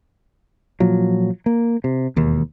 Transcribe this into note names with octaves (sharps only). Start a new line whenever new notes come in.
A#2 F3 F#3
A#3
C3
E1 D#2